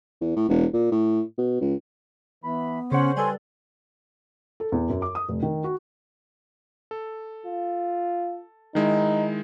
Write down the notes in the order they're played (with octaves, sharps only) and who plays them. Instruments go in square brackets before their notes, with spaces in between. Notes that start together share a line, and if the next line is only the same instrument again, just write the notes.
[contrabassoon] E2
A2
E1
A#2
A2
B2
C#2
[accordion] E3 B5 [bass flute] B3
[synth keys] C#3 F#5 [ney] C#4 [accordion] C5 C#5
[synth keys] G3 A4 [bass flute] B4 [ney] G#5
[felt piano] A4
E2
F#2
D6
D#6
F1
D#3
F#4
[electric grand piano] A4
[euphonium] F4
[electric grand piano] D#3 G#3 E4 [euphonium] D#4